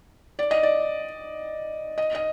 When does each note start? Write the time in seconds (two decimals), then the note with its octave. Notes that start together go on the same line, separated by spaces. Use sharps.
0.39 D5
0.51 D#5
0.63 D5
1.98 D#5
2.15 D#5